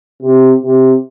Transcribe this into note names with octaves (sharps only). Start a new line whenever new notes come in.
C3
C3